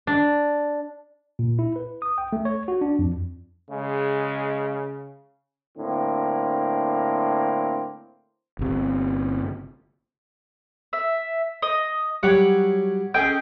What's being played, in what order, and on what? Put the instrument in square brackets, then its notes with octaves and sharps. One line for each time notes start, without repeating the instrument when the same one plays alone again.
[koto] D4
[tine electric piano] A#2
E4
B4
D#6
G5
A3
C#5
F#4
D4
F2
[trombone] C#3 [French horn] G#3
[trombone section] A2 D3 A#3 C4
[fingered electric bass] G1 C3
[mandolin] E5
D#5
[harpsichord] F#3 G3 D6 [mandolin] C#5 F#5
[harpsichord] C#4 A4 D#5 [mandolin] G#4 G5